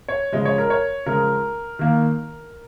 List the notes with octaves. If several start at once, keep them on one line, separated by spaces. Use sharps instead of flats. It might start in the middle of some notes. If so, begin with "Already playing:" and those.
C#5
C#3 F3 G#3 D#5
C#5
A#4
C#5
C#3 F3 G#3 A#4
D#3 A#3